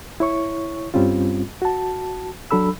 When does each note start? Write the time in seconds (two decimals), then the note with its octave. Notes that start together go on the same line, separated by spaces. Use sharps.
0.20 E4 C#5 C#6
0.94 G2 G3 C4 C#4 F4
1.62 F#4 A5
2.51 F#3 D4 A4 B5 E6